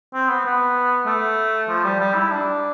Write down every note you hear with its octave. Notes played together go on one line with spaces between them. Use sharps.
C4
B3
B3
A3
F3
G3
G3
E4
D4